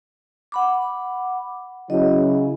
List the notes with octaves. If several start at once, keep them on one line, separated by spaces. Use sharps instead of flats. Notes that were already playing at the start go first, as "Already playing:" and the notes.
F#5 B5 D6
C#3 F#3 E4 D#5